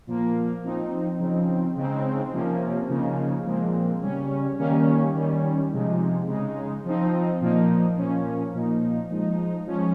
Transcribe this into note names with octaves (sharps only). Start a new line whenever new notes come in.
A#2 F3 A#3
F3 C4 D#4
C#3 F3 C4 D#4
C#3 G#3 C4 D#4
C3 F3 A#3 C#4
C#3 F3 A#3 D#4
A#2 F3 G#3 C4
C#3 G3 C#4
D#3 G3 A#3 C#4
D#3 G3 C#4
C3 F3 G#3 D#4
C#3 G#3 D#4
F3 C4 D#4
A#2 F3 A#3 D#4
A#2 F3 A#3 C#4
A#2 F3 A#3 D#4
F3 G#3 D#4
F3 G#3 C#4